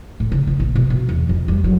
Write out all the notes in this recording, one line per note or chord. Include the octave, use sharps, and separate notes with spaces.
A2
C#3
D#3
A#1
B2
B2
E2
F2
G3
F#3